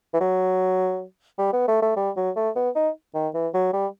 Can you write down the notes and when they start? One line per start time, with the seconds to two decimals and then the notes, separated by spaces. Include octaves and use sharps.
0.13 E3
0.20 F#3
1.38 G3
1.53 B3
1.68 A3
1.82 A3
1.96 G3
2.16 F#3
2.36 A3
2.56 B3
2.75 D#4
3.14 D#3
3.34 E3
3.54 F#3
3.73 G3